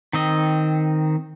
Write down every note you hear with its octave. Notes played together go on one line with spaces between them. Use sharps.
D#3 C4 D#5